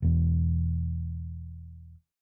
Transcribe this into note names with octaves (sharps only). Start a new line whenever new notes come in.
E1 E2